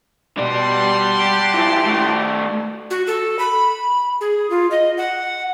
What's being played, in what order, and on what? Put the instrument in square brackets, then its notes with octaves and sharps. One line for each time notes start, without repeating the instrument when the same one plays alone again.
[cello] B2 [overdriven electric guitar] G3 D5 [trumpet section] F#5 A5 C6
[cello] G4
[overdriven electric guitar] E3 F3
D#3 A3
[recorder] F#4
A4
B5
G#4
F4
D#5
F#5